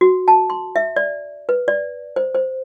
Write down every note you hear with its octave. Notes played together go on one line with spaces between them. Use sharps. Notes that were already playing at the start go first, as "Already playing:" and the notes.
F#4
A5
C6
E5
D5
B4
D5
C5
C5